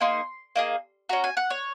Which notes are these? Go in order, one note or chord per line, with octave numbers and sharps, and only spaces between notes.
A#3 D#4 G#4 C6
A#3 D#4 G#4
C#4 F#4 A#5
G#5
F#5
C#5